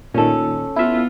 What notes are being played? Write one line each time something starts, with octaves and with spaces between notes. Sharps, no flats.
A#2 D#3 C#4 A4
B3 E4 F4 E5